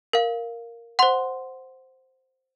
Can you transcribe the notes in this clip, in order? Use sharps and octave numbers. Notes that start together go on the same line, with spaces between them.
A#4 F5
C5 F#5 C6